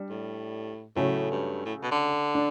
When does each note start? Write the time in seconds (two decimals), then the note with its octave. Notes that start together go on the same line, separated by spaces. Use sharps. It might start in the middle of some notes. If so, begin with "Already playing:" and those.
Already playing: G3 D4
0.10 A2
0.96 A2 C#3 F#3 A3 C#4
1.31 G2
1.66 A2
1.83 B2
1.92 D3
2.35 D4